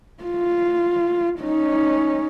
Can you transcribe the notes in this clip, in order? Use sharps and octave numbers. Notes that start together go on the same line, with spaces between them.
F4
C#4 D#4